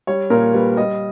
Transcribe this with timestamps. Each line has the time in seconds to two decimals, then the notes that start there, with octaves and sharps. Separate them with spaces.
0.07 G3 C#5
0.30 A#2 A#4
0.54 G3 B4
0.77 G3 D#5